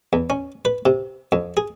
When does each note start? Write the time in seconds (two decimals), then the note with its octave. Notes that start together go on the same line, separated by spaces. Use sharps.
0.13 E2
0.30 C#4
0.65 B4
0.86 C3
1.32 F2
1.57 G#4